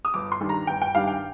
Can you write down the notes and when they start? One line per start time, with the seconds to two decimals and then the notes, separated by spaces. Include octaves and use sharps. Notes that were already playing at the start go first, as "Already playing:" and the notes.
0.05 D#6
0.14 G1 D6
0.32 C6
0.41 G2 D#3 G3 D4
0.49 A#5
0.67 G1 G5
0.82 G5
0.95 G2 D#3 G3 D4 F5
1.08 G5